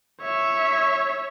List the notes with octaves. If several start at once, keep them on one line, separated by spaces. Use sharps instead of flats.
C#5 E5